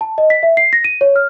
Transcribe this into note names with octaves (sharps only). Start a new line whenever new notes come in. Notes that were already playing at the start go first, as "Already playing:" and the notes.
A5
D#5
B6
E5
C7
A#6
D#7
C#5
F6